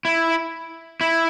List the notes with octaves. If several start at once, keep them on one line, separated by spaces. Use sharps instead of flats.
E4
E4